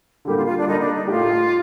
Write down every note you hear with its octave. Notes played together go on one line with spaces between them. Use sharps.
D3 G3 A#3 G4
F4
F4
D4
D3 G3 A#3 D#4
D4
D#4
A2 A3 D#4 F4 G4